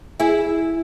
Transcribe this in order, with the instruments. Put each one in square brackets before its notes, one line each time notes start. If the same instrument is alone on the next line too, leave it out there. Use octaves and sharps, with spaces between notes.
[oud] E4 G#4